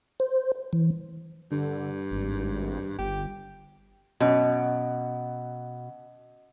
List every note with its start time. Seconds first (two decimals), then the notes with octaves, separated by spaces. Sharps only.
0.20 C5
0.73 E3
1.52 G2 D3
2.11 G#1
2.99 G1 G4
4.20 F#2 B2 D#5